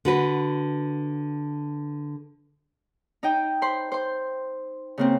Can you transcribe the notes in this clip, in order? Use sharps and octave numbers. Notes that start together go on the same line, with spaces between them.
D3 F#4 B4
D#4 D#5 G5
C5 B5 C6
C5 C6
C#3 A#3 C4